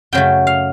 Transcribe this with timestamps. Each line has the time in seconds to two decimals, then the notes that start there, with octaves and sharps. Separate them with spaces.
0.13 F#2 C#3 F#3 A3 G5
0.47 F5